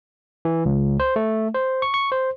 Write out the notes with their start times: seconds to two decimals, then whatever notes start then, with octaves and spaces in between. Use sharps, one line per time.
0.45 E3
0.66 C#2
1.00 C5
1.16 A3
1.54 C5
1.82 C#6
1.94 C#6
2.12 C5